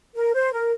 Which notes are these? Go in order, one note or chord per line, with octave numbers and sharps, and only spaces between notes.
A#4
C5
A#4